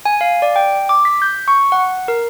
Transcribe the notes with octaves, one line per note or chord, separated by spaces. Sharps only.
G#5
F5
D5
G5
D6
B6
G6
C#6
F#5
A#4